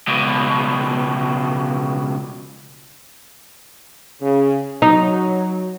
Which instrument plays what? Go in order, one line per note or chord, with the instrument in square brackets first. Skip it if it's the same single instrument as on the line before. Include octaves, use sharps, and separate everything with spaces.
[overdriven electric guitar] C#2 B2
[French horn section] C#3
[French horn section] F#3 [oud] D#4